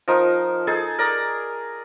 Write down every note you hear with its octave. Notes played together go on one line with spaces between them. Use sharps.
F3 D#4 A#4
D#4 G#4 A4 A5
A#4 D5 A#5